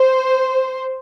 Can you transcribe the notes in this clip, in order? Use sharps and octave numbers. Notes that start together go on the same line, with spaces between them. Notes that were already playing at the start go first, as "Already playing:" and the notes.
Already playing: C5